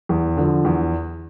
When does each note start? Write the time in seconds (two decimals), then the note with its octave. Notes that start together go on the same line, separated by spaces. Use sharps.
0.09 E2
0.37 D3 F3
0.65 E2